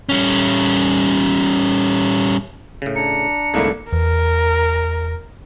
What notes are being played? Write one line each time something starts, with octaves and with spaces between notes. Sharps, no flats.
G3 C#4
A2 C#3
D4 A#5 C#7
C2 G#2 D3 A3 A#3 E4
E2 A#4